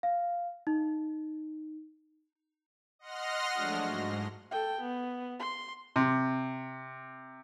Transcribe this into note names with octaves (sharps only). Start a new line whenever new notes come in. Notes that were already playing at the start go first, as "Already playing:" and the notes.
F5
D#4
D#5 F#5 C6 F6 A#6
F3 F#3 G#3 A3 D4 F#4
G#2
A4 G5
B3
C6
C3